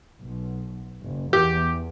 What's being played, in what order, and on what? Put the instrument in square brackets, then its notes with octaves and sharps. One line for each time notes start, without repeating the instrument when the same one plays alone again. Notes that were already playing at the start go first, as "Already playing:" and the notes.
[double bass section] B1
F#1
[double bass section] E2 [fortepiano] G4